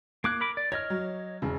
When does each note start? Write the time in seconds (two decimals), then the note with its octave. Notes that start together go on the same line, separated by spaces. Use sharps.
0.24 A#3 D6 F#6 G#6
0.41 A#4 B5 D6
0.57 D5
0.72 C#5 D#5 F6 G#6
0.90 F#3
1.42 E1 C#3